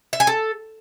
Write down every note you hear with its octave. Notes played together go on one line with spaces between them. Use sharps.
E5
G#5
A4